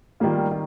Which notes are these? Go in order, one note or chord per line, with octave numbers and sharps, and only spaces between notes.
D#3 G3 A#3 F4
D#3